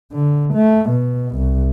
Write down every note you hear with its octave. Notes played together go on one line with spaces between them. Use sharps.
D3
A3
B2
C2